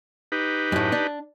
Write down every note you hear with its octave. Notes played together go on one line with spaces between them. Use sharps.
D#4 G4 B4
F#2 A2
D4